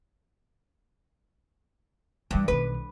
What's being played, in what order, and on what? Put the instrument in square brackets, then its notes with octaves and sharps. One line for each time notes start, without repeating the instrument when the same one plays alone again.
[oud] G2 [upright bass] E3 G3
[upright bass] B1 D#3 [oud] B4